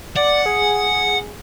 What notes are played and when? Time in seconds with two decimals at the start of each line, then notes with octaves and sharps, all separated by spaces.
0.16 D5 F#5
0.46 G#4